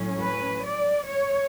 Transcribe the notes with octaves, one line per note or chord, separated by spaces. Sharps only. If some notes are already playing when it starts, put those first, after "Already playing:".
Already playing: A2 F#3 C#4
B4
D5
C#5